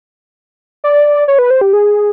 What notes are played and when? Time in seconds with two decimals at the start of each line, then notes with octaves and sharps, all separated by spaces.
0.84 D5
1.28 C#5
1.39 B4
1.50 C5
1.61 G4
1.73 G#4